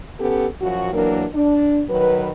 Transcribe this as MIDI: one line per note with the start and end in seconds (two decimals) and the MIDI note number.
0.19 0.46 59
0.19 0.46 61
0.19 0.46 67
0.19 0.46 69
0.61 0.93 42
0.61 0.93 53
0.61 0.93 66
0.93 1.24 52
0.93 1.24 54
0.93 1.24 58
0.93 1.24 62
0.93 1.24 70
1.33 1.82 62
1.90 2.30 51
1.90 2.30 54
1.90 2.30 71